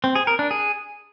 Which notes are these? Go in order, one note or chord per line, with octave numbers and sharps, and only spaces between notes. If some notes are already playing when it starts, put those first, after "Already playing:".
C4
G#4
A#4
D4
G#4